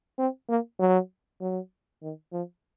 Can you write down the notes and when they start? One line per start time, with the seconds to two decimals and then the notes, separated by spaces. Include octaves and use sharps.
0.18 C4
0.49 A#3
0.80 F#3
1.41 F#3
2.02 D#3
2.32 F3